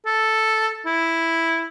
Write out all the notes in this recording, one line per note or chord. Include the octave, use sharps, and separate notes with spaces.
A4
E4